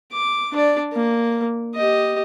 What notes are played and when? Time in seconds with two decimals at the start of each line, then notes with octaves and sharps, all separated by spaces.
0.12 D6
0.52 D4 D5
0.94 A#3
1.75 G4 D#5